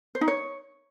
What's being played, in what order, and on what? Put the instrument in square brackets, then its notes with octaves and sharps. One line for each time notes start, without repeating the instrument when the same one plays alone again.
[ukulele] C5
D#4
C#5